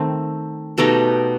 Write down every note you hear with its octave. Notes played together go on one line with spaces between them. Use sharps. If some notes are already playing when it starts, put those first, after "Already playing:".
Already playing: D#3 A3 C4
B2 A3 D#4 G4